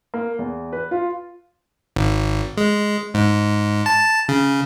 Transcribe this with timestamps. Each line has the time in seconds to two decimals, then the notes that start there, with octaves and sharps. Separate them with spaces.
0.14 A#3
0.39 E2
0.73 B4
0.91 F4
1.96 G#1
2.57 G#3
3.14 G#2
3.86 A5
4.29 C#3